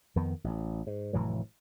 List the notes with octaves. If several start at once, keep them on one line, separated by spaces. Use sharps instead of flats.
F2 D#3 B3
A1
G#2
F1 A2 E3 F#3